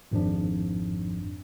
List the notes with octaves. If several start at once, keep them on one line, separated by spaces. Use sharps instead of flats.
G#1 F2 G#2 F3 D4